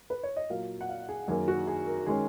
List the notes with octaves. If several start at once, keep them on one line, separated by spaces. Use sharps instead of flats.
B4
C#5
D#5
A#2 F#3 A#3 F5
F#5
F5
G#4
F#2 D#3 F#3 A#3 G#4
F#4
G#4
A#4
D#3 G#3 C#4 G#4